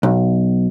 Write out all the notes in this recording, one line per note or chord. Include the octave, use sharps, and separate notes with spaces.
B1